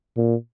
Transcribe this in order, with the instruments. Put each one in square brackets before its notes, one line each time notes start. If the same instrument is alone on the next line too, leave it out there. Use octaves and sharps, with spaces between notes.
[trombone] A#2